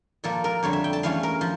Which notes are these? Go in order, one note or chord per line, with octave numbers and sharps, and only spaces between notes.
A#2 F3 A#3 A4
A#4
F2 D3 G3 C#5
E5
G5
A5
E2 E3 A3 C#4 F5
A#4
F3